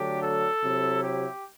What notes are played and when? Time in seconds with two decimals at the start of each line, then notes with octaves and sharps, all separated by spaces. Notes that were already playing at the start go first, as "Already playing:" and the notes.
Already playing: D3 F#3 A3 D4 G4
0.22 A4
0.62 C3 F#3 C4 E4
1.03 G4